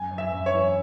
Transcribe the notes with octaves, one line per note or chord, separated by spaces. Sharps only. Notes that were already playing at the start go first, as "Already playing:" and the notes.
Already playing: F#2 G#5
F#2
E5
F#2
C#5
E3